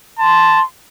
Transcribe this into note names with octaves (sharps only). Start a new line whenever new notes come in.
A5 C6